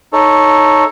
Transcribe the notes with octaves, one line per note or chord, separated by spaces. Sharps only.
D#4 A4 C#5